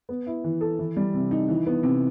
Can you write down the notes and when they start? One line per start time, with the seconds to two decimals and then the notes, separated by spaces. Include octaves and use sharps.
0.09 B3
0.27 E4
0.44 E3
0.61 A4
0.79 E3
0.96 G3
1.14 C3
1.31 D#4
1.48 E3
1.67 B3
1.83 C3